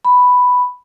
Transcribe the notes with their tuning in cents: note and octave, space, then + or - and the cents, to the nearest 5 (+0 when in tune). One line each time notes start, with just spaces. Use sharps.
B5 +5